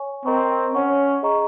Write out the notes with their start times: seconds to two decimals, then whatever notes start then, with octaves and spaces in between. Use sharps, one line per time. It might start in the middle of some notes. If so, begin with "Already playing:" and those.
Already playing: C#5 G#5 C#6
0.25 C4 A#4 D#5 A#5 C#6
0.74 C#4 C#5 F#5 C#6
1.23 G#4 D#5 A#5 C#6